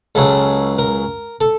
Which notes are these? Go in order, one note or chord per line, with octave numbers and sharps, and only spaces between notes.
C#2 C#3 F#3 A4
A#4
A4